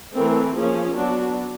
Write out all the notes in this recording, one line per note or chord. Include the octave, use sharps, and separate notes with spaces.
E3 A3 C4 A#4
F3 A#3 C#4 G#4
F#3 B3 D4 F#4